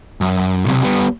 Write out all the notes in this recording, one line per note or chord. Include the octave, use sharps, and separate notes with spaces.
F#2
B1 C3
G3 B3